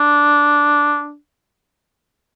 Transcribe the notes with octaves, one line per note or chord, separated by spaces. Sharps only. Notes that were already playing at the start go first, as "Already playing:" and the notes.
Already playing: D4